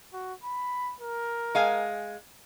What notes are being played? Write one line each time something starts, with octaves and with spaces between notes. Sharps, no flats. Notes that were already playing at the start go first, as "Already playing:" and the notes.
F#4
B5
A#4
G#3 F5 G#5